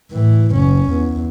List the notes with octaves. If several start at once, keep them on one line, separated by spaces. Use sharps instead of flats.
A2 E3
F#1 C#4
E2